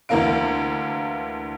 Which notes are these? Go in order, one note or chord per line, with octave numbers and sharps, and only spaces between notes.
D2 E3 A#3 A#4 F5 D7